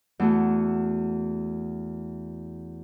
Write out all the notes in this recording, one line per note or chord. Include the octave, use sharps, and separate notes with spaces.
E2 A3 F#4